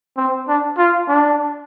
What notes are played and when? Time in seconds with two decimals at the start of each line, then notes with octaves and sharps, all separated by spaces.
0.17 C4
0.48 D4
0.78 F4
1.08 D4